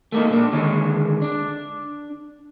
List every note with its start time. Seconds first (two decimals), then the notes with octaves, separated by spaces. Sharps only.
0.12 A3 A#3 D#4
0.30 A#2 D4
0.53 D3 D#3 G#3 C#5
1.22 D4